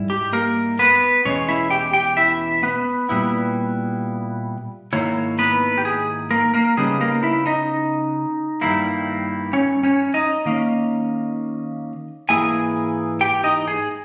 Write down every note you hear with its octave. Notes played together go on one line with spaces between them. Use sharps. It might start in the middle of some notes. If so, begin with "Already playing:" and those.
Already playing: G#2 G3 E4
G4
A#3 A#4
B3 B4
E2 B2 G#3 C#4 C#5
E4 E5
G4 G5
G4 G5
E4 E5
B3 B4
A#2 G3 B3 E4
G#2 D#3 A#3 E4 C#5
B3 B4
G4
G#4
A#3 A#4
A#3 A#4
C#3 G3 B3 D#4 G#4
A#3 A#4
E4 E5
D#4 D#5
G2 D#3 G3 A#3 E4
C#4 C#5
C#4 C#5
D#4 D#5
D#3 A#3 C#4
G#2 E3 A#3 E4 G#4 G#5
G4 G5
D#4 D#5
G#4